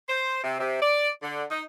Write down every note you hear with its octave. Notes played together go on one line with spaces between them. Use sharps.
C5
C3
C3
D5
D3
D#4